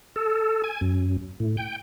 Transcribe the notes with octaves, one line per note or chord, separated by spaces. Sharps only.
A4
G#5
F#2
A2
G5